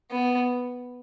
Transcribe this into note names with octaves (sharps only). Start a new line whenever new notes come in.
B3